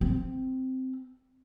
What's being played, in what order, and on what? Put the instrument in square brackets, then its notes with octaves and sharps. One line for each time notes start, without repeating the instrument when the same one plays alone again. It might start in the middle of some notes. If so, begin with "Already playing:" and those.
[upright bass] C4